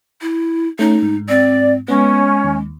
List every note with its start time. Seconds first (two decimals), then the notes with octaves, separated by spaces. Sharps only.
0.21 E4
0.79 A3 C#4 D#4 A#5
1.02 G#2
1.29 C4 D5
1.88 G#3 B3 C#4
2.44 D#2